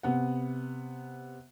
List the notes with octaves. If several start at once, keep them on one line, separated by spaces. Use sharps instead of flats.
C3 B3 F#5